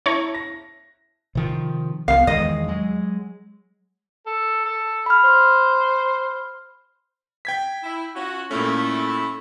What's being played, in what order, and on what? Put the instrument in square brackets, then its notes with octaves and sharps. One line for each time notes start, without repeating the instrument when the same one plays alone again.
[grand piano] E4 A5 [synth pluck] C#5 A#5 C#6
[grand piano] A#6
[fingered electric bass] C3 D#3 F3
[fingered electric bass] C2 F3 B3 [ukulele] F5
[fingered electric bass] E2 D#3 G#3 [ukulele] D#5
[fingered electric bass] F#3 G#3
[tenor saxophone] A4
A4
[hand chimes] B5 F6
[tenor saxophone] C5
[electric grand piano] G5 G#6 B6
[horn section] E4
C#4 F4 F#4
[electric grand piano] A#2 C#4 [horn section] A3 E4